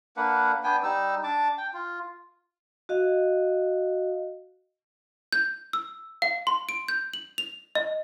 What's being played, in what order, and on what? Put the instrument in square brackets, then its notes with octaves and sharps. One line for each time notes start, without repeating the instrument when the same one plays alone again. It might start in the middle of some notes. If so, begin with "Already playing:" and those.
[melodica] A#3 D4 B4 F#5
B3 D4 G5 G#5
G3 D#4 E6
D4 A5 D6
G5
F4
[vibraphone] F#4 D#5 F5
[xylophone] G6
E6
F5
C6
D7
G6
F#7
F7
D#5